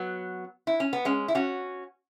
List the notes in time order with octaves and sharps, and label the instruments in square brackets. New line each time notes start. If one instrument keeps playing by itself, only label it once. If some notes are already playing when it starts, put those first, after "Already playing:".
Already playing: [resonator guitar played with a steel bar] F#3 B3
E4
C#4
B3
G#3 C#4
E4
C#4 F#4